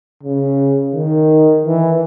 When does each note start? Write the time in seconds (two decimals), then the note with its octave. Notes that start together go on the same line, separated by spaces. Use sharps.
0.24 C#3
0.95 D#3
1.66 E3